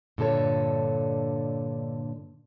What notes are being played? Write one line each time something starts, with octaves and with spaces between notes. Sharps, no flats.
G2 A#2 D3 A4 C#5